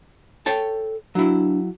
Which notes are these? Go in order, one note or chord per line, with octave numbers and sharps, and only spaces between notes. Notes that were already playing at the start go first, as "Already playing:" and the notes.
A4 C#5 G5 A5
F#3 D4 E4